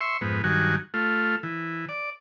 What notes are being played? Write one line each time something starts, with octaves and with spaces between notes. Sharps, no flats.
E5 C6 C#6
F2 G#2 B3
G2 D#3 F#3 F#4 G#5
A3 F4
E3
D5